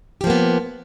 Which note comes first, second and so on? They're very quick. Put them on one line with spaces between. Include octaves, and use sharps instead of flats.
G4 F3 A#3 B3